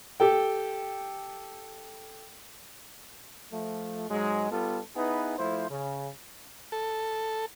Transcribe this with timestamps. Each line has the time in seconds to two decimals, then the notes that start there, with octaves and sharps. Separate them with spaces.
0.20 G4 A4 G5
3.51 F3 A3
4.10 G#2 F#3 G#3
4.51 G3 B3 F4 A4
4.96 B3 D#4 E4 G#4 B4
5.38 F3 A3 E4 C5
5.70 C#3
6.72 A4